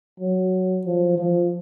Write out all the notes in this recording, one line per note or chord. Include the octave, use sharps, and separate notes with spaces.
F#3
F3
F3